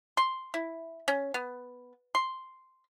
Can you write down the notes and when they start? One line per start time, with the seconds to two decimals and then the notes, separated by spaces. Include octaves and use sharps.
0.17 C6
0.54 E4
1.08 C#4
1.34 B3
2.15 C6